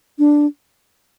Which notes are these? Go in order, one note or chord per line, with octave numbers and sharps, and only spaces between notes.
D4